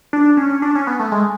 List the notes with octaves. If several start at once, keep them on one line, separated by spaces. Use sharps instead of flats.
D4
C#4
C#4
D4
C#4
B3
A3
G#3